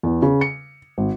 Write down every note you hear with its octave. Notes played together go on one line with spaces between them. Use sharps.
E2
C#3
C#7
G#1